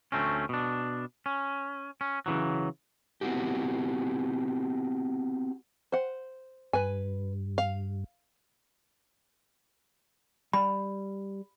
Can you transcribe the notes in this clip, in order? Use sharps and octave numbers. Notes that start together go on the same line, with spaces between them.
D2 A3 C4 C#4
B2 D4
C#4
C#4
C#3 E3 F#3
B3 C4 E4 F#4 G4
C5 F#5
G2 B4 G#5
F5
G3 B5